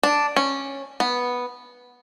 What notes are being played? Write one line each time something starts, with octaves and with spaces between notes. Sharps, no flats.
D4
C#4
B3